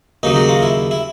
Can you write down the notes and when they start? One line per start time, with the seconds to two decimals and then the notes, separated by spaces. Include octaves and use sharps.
0.23 D#2 C#3 F#3 D#4
0.36 F#4
0.49 F4
0.63 E4
0.91 E4